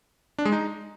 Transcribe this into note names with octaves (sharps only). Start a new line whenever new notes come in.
D4
G#3
D#4